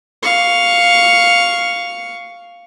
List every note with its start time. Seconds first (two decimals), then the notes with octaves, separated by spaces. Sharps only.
0.23 F5 C#6